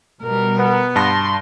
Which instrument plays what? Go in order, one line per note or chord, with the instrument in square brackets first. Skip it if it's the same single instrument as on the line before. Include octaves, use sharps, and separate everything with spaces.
[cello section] B2 G3 [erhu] A#4
[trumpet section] B3
[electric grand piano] G2 A5 A#6 [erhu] C6